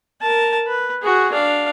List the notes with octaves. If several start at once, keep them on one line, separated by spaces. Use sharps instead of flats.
A#4 A5
B4
F#4 G#4
D4 F5